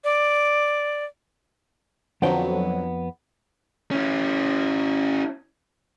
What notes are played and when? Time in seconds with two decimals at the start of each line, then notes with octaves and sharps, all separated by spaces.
0.04 D5
2.22 F2 D3 F3 F#3 B3 G5
3.91 C#4 E4